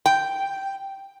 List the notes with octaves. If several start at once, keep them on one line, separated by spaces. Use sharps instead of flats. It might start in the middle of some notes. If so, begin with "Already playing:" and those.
G5